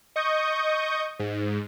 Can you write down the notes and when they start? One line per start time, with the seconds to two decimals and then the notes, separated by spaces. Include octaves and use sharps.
0.16 D#5 C#6 D#6 G6
1.19 G#2